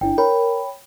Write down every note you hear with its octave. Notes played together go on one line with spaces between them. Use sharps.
G1 D4 E4 G5
A#4 C#5 G5 B5